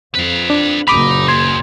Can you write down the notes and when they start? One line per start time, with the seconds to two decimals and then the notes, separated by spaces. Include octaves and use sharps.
0.15 F2 B4 F5
0.50 D4
0.88 F#1 A#2 C#3 D#4 B5 D6
1.28 D#2 C6 G#6